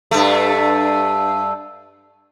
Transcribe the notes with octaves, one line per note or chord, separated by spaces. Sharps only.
G2 A3